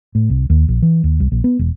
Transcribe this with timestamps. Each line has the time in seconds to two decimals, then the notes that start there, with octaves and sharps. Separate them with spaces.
0.15 A2
0.30 C2
0.50 D#2
0.68 A#1
0.82 E3
1.04 D#2
1.20 C2
1.32 A#1
1.44 B3
1.59 E1